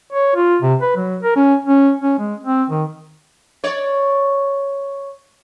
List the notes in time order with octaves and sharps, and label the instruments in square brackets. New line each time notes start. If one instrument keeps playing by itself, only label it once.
[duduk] C#5
F4
C3
B4
F#3
A#4
C#4
C#4
C#4
G#3
C4
D#3
[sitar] C#5 D5